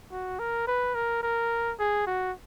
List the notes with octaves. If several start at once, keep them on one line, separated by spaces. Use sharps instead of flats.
F#4
A#4
B4
A#4
A#4
G#4
F#4